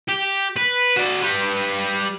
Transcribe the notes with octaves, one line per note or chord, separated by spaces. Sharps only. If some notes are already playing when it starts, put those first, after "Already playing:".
G4
B4
F#4 D5
G3 B4